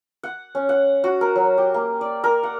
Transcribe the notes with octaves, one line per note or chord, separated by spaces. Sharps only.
F#5
C#4
F#5
F#4
A#4
F#3
G4
A#3
D5
A#4
F#5